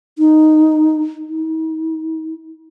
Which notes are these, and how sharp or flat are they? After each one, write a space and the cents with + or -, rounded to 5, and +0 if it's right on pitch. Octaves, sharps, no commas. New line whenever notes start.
D#4 -5
D#4 +45